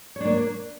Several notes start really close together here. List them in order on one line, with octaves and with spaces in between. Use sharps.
C#5 D4 A#3